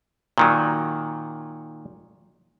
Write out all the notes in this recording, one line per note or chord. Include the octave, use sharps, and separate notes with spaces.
A#2 D#3 F#3